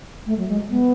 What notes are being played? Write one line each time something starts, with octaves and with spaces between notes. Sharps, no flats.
A3
F#3
G#3
B3